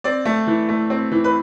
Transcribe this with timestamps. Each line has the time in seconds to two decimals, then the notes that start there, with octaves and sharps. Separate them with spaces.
0.04 C4 D5
0.26 A3
0.47 E3
0.69 A3
0.90 C4
1.11 E3
1.24 B4